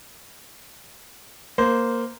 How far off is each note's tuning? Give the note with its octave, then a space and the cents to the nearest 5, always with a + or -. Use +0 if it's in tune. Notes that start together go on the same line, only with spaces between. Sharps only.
A#3 +0 C5 -10